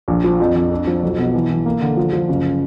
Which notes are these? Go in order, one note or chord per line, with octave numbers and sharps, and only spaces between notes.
A#1
F3
F2
F2
D4
F3
B1
B2
E3
E3
A#3
D3
F3
F3
F#1